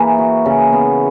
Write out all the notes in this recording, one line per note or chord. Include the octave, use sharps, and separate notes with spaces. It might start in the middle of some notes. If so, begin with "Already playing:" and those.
Already playing: E3 A#3 E4 G#4
F#4
C#3
B3